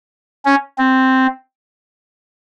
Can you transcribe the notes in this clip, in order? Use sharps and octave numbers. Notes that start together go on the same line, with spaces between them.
C#4
C4